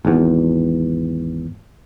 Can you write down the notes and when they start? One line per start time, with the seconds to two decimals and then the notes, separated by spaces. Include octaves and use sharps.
0.05 G#1 E2